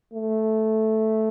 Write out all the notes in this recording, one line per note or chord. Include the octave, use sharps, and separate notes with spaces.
A3